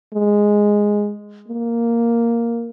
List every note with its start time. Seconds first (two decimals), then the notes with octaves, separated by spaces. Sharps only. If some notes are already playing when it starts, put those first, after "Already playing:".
0.13 G#3
1.48 A#3